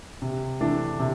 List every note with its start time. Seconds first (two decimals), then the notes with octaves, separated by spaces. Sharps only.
0.22 C3
0.61 E3 A3 D4
0.99 C3